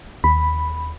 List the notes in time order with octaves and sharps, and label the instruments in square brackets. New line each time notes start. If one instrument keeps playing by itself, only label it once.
[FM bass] D#2 [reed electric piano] B5